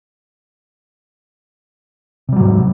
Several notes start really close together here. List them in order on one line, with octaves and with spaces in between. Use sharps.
C3 G3 F#3 G#2